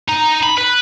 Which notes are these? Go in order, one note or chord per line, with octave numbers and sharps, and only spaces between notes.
D#4
B5
B4